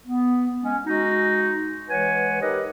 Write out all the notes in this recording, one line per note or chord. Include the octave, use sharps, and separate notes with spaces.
B3
G#3 C#4
G#3 D#4 F#4
E3 G#3 B4 C#5 F#5 G#5
D#4 G4 A#4 B4 D#5